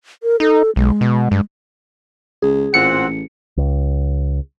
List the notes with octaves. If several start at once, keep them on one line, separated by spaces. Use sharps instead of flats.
A#4
D#4 A4
B1 G#3
B2
G2
C#2 G#4
A1 A#2 C4 F#5 C#7
C#2